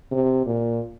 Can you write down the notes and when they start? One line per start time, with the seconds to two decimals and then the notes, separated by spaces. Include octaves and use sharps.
0.11 C3
0.46 A#2